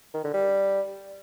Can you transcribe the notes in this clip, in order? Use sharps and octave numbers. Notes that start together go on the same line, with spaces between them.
D#3
D3
G3